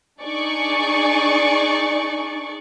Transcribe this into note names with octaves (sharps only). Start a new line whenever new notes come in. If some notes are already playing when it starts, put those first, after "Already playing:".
D4 D#4 G#4 D5 C#6